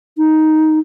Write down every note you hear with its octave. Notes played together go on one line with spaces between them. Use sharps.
D#4